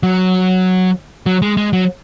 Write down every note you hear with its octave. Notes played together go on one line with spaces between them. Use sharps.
F#3
F#3
G#3
G#3
F#3